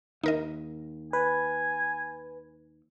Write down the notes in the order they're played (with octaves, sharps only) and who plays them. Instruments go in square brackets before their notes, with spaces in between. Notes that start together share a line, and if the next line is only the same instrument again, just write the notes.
[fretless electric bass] D#2 [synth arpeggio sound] D#4 A#4 D#5
[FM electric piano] B4 [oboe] G#5